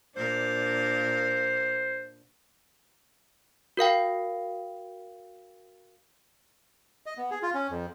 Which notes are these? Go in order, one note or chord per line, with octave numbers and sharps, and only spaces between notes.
A#2 D4 A#4 C5
F#4 A#4 F5 G5
D#5
B3
G#4
F4
C#4
F2